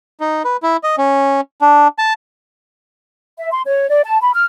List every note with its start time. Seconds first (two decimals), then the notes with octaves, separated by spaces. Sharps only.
0.20 D#4
0.44 B4
0.63 E4
0.84 D#5
0.98 C#4
1.61 D4
1.98 A5
3.38 E5
3.52 C6
3.66 C#5
3.89 D5
4.04 A5
4.21 B5
4.34 F6